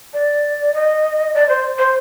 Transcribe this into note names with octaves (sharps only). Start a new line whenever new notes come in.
D5
D#5
D5
C5
C5